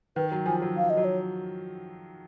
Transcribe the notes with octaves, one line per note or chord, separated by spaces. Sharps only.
D#3 B4
F#3
F3 G#5
F#3
F3 F5
D#5
F#3
C#5